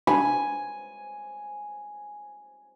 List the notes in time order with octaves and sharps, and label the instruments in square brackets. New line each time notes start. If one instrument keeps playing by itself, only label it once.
[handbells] D4 B5 [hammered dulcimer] G#5